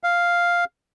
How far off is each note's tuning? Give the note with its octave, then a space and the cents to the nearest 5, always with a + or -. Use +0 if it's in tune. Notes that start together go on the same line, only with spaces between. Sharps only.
F5 +0